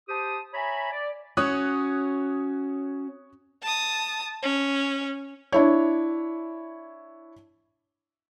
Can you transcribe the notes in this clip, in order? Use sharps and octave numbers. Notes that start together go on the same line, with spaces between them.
G4 C5 A5 D#6
C#5 E5 G#5 A#5 B5
D5
C#4 F#4 C#5 D#6 F#6
A5 D#6
C#4
D4 E4 C#5